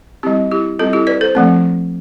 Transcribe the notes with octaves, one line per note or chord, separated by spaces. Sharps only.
G3 C4 E4 G4
E4 G4
G3 C4 F4 A4
E4 G4
B4 D5
A4 C5
F3 A3 C4